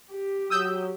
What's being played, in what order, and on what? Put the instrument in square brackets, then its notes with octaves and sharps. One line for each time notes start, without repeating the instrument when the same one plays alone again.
[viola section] G4
[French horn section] F#3 [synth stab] D#6 E6 G6